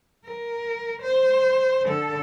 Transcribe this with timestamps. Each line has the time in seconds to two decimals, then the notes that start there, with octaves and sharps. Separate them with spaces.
0.25 A#4
1.02 C5
1.85 D3 A4